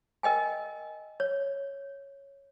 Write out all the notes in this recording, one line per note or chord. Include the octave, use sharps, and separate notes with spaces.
A#4 D#5 G5 G#5
C#5